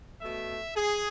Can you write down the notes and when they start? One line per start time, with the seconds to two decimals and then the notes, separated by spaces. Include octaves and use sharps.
0.21 B2 A3 E5
0.76 G#4